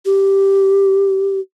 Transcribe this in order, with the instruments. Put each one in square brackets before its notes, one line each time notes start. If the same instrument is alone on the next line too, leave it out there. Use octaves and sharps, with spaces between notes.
[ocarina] G4